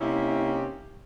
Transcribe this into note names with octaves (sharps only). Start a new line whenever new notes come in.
C3 A#3 C#4 D#4 E4 G4